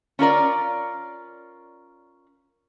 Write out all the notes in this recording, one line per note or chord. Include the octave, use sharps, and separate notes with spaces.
C#4 F4 A#4 D5